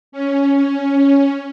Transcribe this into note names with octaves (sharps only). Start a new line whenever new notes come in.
C#4